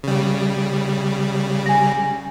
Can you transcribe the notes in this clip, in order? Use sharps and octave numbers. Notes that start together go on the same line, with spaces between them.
C#3 G3
G#5 A#6